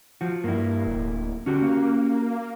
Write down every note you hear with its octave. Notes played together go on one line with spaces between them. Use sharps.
F3 F#4
G2 A#3 E4
D1
D3 C#4 F#4 G4
A#3